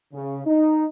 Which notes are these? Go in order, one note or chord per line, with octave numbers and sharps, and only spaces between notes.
C#3
D#4